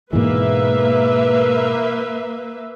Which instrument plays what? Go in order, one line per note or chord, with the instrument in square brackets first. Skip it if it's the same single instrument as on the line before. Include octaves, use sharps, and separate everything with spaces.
[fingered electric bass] G#2 B2 E3 [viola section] A#3 B4 E5